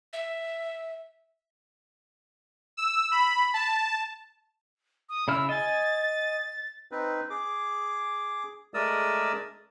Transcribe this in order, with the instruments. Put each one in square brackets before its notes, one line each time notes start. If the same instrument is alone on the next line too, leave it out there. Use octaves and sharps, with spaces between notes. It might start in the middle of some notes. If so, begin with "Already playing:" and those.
[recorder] E5
[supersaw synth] E6
B5
A5
[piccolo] D#6
[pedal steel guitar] C#3 E4 F6 [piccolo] E6
[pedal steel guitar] D#5 G#5 [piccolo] A6
[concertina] C4 D#4 B4
G#4 D6
G#3 A3 A#4 D5 D#6 E6